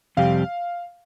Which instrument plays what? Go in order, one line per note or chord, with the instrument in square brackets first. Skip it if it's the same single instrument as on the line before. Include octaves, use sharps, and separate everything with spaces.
[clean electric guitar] F2 C3 G3 C4 G4 [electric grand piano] F5